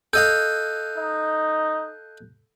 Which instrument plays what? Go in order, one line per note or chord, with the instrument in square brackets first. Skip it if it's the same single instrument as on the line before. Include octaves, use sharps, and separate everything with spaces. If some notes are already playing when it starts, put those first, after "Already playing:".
[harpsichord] A4 D#5 F5 [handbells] F#6 G6
[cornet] D#4